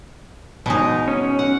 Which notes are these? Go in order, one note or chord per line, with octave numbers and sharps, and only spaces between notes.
B2 G#3 D#4
C#4
F#5